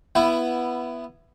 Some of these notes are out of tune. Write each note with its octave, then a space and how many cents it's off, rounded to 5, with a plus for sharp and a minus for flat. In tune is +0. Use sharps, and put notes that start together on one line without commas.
B3 +0 E4 +15